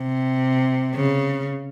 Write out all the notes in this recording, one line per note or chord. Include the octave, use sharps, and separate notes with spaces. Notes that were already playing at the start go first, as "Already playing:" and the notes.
Already playing: C3
C#3